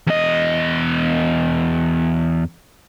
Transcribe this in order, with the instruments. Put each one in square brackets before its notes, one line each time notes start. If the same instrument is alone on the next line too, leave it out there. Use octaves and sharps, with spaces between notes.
[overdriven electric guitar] E2 D#5